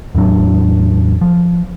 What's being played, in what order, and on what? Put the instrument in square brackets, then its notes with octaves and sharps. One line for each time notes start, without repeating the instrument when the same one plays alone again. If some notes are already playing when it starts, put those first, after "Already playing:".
[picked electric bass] E2 A2 F#3 D4
F3